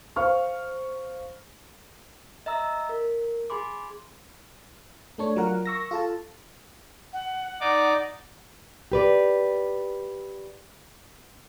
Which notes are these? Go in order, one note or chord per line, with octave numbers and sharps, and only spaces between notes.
C5 F5 C#6 F6
D#5 E5 A#5 E6
A#4
G#4 G#5 B5 C6 D6
A3 D4 C#5
F#3 F4 A#4 F#5
C#6 E6 A#6
F4 A4 A5
F#5
D#4 D5 D6
G4 B4 D5